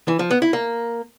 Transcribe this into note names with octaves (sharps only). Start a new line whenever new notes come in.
E3
F3
B3
E4
A#3